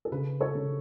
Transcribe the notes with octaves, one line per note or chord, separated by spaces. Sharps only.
A4
C#3 B4
A4 C#5
C#3